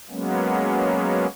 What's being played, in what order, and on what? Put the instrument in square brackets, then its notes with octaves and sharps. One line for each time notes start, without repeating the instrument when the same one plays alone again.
[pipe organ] F#3 G#3 A#3 B3 C#4